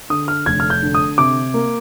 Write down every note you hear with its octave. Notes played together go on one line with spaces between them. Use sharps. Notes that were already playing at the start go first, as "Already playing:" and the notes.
D3 D#6
F6
F1 G#6
F6
G6
D3
D#6
C3 D6
A#3